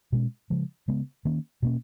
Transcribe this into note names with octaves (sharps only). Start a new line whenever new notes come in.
B2 G#3 C#4
C#3 F3 G#3
C#3 G#3 B3
D#3 A#3 C#4
B2 A#3 C#4